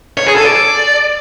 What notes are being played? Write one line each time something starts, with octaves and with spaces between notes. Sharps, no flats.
C#5
G#4
A4
D5